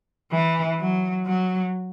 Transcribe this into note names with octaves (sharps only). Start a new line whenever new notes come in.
E3
F#3
F#3